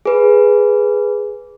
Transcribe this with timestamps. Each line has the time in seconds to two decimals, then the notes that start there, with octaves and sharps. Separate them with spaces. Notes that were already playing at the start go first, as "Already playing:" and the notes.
0.05 G#4 B4